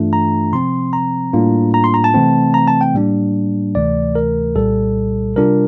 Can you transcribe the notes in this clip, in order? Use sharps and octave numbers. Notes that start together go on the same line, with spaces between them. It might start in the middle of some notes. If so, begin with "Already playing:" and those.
Already playing: G2 E3 A3 D4 F4
A#5
C3 F3 C4 C6
A#5
A2 G3 A#3 D4 F4
A#5
C6
A#5
A5
C3 E3 A3 C4
A#5
A5
G5
A2 G3 A#3 D4
D2 C3 E3 A3 D5
A#4
C2 A#2 G3 A4
C3 G3 D4 F4 A#4